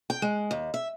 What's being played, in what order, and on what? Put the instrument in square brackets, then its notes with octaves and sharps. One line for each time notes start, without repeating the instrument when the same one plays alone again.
[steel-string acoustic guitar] G5
G#3
D#2
E5